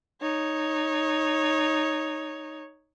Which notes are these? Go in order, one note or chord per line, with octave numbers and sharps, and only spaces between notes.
D#4 C#5